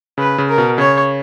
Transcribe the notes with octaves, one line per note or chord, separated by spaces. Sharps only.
C#3 B4
C#3
A#4
B2
C#3 C#5